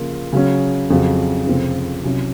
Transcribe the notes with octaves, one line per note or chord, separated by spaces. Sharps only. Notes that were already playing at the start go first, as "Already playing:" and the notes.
Already playing: C#3 F3 A#3 F4 A#4
C#3 F#3 C#4
F2 C#3 F#3
F1 F2 C#3 F3 C4
C2 C3 F#3 C#4